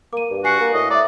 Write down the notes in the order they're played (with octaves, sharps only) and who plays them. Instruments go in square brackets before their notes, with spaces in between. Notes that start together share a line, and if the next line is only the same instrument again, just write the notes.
[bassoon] A#3 [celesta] D6 D#7
[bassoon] G2
[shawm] F#4 [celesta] G#5 C7 C#7
[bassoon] A#3
[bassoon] A2 [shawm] D#5
[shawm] D5 [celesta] E5 A#5